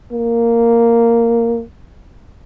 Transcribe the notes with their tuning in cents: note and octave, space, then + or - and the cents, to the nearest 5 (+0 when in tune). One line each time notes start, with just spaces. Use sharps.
A#3 -5